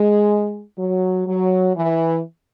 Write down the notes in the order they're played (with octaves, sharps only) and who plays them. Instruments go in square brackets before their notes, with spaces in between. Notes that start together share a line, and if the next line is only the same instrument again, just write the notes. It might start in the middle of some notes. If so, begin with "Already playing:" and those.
Already playing: [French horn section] G#3
F#3
F#3
E3